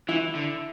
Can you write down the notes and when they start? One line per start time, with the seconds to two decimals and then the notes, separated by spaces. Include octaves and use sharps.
0.08 E3 E4
0.35 D3